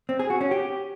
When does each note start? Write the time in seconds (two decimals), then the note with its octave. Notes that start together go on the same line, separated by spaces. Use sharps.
0.09 C4
0.19 G#4
0.30 F#4
0.41 C#4
0.51 G4